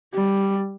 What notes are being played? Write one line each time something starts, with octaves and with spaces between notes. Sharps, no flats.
G3